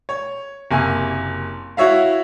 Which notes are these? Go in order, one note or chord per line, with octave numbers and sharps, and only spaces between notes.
C#5
F#1 C3 A#3 G#5
E4 F#4 C#5 E5 F5